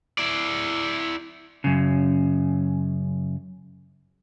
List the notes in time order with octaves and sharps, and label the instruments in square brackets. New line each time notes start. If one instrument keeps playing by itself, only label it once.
[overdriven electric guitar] E4 D5
[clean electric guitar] F#2 C#3